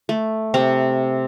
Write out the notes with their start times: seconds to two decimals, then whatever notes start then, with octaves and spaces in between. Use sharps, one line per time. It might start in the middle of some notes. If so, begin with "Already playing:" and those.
0.09 A3
0.54 C3 C4